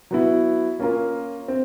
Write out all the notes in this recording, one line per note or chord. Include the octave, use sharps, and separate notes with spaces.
F#3 B3 E4
A#3 C#4 F4 A#4
C4